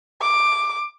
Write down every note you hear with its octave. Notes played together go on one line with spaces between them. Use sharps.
D6